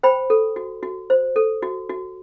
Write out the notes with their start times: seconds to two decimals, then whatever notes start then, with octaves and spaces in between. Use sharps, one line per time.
0.03 C5 G5 B5
0.30 A4
0.56 F#4
0.83 F#4
1.10 C5
1.36 A4
1.62 F#4
1.90 F#4